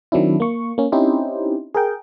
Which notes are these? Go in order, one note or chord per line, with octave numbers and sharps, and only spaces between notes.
D#3 F#3 C4 D4 E4
A#3 C#6
A#3 C#4
C4 C#4 D#4 E4 G4 C5
G#4 A#4 G5